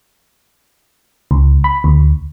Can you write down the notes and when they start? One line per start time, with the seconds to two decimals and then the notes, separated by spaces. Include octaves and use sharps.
1.31 C#2
1.64 B5
1.84 D2